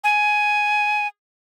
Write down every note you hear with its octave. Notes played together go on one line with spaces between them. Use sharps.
G#5